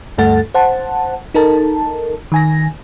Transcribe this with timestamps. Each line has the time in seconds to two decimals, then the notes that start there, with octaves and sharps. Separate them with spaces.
0.18 D2 G2 A3 A4 F#5 A6
0.54 C5 F#5 A5
1.34 D#4 A4 A#4 A5
2.32 D#3 G#5 A#6